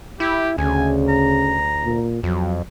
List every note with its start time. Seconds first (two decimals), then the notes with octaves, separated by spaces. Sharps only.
0.20 E4 G4
0.58 D2 C#3 G#5
1.08 A#5
1.84 A#2
2.23 F2 F#3